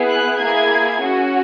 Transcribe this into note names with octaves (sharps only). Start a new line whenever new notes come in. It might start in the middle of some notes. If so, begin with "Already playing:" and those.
Already playing: B3 E4 G#4
F#6
A#3 E4 G#4 G#6
C#4 F#4